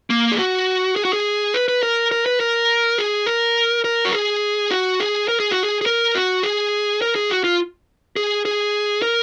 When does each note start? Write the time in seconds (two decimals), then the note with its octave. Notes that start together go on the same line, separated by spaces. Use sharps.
0.10 A#3
0.32 G#4
0.39 F#4
0.96 G#4
1.05 F#4
1.13 G#4
1.54 B4
1.68 B4
1.83 A#4
2.11 A#4
2.26 B4
2.40 A#4
2.98 G#4
3.26 A#4
3.84 A#4
4.05 F#4
4.13 G#4
4.71 F#4
5.00 G#4
5.28 A#4
5.40 G#4
5.51 F#4
5.63 G#4
5.81 G#4
5.86 A#4
6.15 F#4
6.43 G#4
7.02 A#4
7.15 G#4
7.30 F#4
7.44 F4
8.16 G#4
8.45 G#4
9.02 A#4